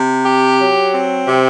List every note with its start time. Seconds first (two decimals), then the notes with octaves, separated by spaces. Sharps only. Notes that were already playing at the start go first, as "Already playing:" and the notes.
Already playing: C3
0.25 G4
0.59 F#3
0.93 C4
1.28 C3